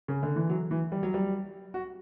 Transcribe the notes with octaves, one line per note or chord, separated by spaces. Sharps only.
C#3
D3
E3
F#3
E3
G3
F#3
G3
F#4